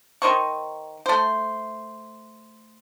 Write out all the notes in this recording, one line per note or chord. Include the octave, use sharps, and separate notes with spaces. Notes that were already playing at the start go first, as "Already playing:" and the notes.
D#3 D#4 C5 C#6
A3 C5